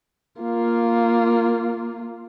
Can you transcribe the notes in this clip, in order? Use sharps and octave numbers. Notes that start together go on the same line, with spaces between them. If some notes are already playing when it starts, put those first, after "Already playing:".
A#3 F4